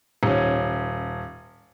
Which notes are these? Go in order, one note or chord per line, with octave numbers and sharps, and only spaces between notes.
D#1 C#4